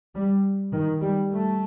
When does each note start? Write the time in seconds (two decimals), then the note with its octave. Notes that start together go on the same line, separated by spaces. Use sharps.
0.14 G3
0.73 D#3
1.01 G3
1.31 A3